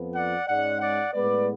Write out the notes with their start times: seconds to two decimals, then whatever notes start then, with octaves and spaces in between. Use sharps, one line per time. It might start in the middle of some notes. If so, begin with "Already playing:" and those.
Already playing: F2 F3 B3
0.15 D5 F#5
0.47 G#2 G#3 C#4 D5 F#5
0.81 D5 F#5
1.13 A2 G#3 B3 B4 D5